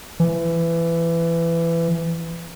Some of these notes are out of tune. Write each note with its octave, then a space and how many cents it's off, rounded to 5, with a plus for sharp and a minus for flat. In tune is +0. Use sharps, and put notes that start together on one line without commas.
E3 +20